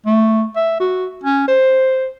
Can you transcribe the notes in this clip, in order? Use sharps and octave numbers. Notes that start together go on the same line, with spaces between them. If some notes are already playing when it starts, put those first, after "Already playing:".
A3
E5
F#4
C#4
C5